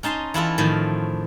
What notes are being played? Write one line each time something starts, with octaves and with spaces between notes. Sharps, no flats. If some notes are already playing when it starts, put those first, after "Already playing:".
C#4 D#4 A5 C6
E3 E4 F4 A4
A2 D#3 F3